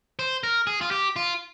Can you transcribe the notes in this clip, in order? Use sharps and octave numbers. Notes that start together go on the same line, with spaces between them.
C5
A#4
G#4
F4
G4
F4